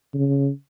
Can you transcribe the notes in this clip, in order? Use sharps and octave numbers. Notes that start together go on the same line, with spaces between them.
C#3